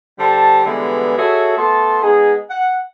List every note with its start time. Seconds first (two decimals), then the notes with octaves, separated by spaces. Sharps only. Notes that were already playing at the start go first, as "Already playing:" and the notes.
0.19 D3 G3 C5 A5
0.65 D3 E3 G3 G#3 B3
1.17 F#4 G#4 A4 C#5 E5
1.57 A3 B3 A5 C6
2.02 G#3 B3 D#4 G#4
2.49 F#5